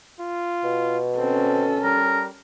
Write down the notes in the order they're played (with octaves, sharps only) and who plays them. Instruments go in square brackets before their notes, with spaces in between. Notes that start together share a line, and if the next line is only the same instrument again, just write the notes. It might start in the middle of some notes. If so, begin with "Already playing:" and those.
[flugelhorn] F4
[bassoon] B2
[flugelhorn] C4 [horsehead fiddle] C#4 A4
[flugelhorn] G3 [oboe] A#4